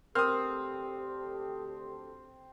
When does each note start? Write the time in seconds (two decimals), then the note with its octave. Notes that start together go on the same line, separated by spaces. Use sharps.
0.15 D2 C4 G4 A4 A#4 D#6 F6